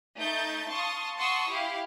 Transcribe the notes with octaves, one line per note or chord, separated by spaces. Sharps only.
A3 D#4 E5 G6 A6
F5 A5 C6 C#6 D#6
F#5 A5 C6 C#6 D#6 E6
E4 G4 F5